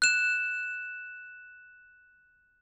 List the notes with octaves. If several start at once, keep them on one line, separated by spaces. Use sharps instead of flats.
F#6 E7